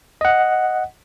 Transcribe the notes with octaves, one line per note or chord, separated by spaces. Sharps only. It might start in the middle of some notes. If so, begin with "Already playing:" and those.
D#5 F#5